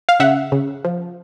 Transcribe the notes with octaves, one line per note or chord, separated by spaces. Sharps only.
F5
C#3 E5 F#5
C#3
F3